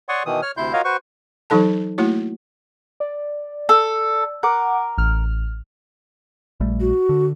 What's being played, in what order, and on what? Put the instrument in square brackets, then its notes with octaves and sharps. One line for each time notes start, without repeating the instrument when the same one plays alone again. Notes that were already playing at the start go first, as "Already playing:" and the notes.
[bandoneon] C#5 D5 F#5 C6 C#6 D#6
B2 D#3 E3 D#6
C#5 F6
D2 C3 E4 C6 G6
F4 F#4 A#4 C#5 D#5 F5
F#4 B4 C5 C#6
[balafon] E3 F#3 D#4 A4 A5
A3 A#3 E4 F#4 C#5
[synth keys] D5
[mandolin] A4
[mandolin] A#4 [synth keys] F#5 D6
[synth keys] A1 F6
[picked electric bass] A#1 G3 A3
[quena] F#4
[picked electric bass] D3